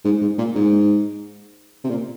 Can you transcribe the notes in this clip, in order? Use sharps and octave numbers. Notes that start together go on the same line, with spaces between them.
G#2
G#2
A#2
G#2
C3
A#2